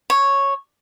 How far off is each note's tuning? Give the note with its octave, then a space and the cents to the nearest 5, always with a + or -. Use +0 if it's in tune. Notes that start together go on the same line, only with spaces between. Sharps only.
C#5 -5